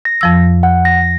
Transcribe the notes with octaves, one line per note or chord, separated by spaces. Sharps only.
A#6
F2 F3 E6
F#5
A#6